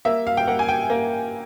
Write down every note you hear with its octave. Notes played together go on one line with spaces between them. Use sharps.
A#3 E5
F5
G5
A#3 F#5
G#5
G5
A#3